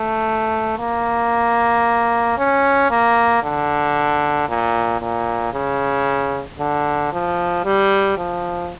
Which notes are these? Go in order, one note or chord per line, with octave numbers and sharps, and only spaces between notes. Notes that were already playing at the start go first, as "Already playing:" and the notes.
Already playing: A3
A#3
C#4
A#3
D3
A#2
A#2
C#3
D3
F3
G3
F3